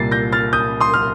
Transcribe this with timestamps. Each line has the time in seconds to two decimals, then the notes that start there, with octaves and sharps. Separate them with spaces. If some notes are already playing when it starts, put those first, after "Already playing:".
Already playing: C2 A#2 G3 A#3 A6 C7
0.11 G6 A#6
0.33 F6 A6
0.53 D#6 G6
0.81 C6 D#6
0.94 F6